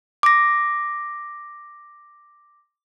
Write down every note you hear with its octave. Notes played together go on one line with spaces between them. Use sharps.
D6 A#6